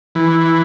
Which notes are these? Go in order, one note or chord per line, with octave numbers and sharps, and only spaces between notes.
E3